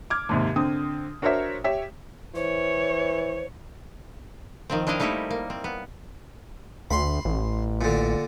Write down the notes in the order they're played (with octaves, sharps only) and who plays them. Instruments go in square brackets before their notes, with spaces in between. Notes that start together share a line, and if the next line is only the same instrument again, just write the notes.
[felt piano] D6 F6 G#6
D#2 G#2 C3
D3 C4 D#6
D4 F#4 A#4 C5 C#5 E5
G4 C#5 E5
[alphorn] E3 [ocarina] C5 [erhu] C#5
[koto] D#3 F3 C4
C4 D4 E4 D#5 F5
G3 A3 A#3 D#4 E4 G4
A#3
C4
B3
[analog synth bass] D2 [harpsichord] B5 C6
[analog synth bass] A1
[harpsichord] A#2 D3